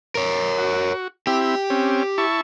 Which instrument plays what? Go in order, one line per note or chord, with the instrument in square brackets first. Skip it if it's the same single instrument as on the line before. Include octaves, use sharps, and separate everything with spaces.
[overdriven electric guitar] A#4 C#5
[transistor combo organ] F#4
[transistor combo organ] C4 E4 [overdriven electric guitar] G4
[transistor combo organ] C4 C#4
E4 A5 C#6